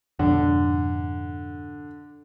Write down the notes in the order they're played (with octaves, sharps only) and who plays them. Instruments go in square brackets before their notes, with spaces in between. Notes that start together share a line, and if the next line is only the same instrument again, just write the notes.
[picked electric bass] F2 G#2 B2 [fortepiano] D3